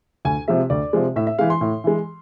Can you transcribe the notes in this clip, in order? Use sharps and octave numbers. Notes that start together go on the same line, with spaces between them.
D2 G#5
C3 F3 G#3 E5
D2 D5
C3 F3 G#3
A2 E5
E5
E3 G#3 F5
C6
A2
E3 G#3